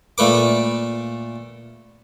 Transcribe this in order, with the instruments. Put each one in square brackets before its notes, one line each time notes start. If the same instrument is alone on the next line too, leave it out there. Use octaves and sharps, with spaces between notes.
[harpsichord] A#2 A3 B4 D6